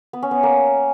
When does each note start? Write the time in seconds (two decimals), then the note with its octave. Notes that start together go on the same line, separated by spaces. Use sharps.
0.13 B3
0.23 C#4
0.31 B3
0.43 A#3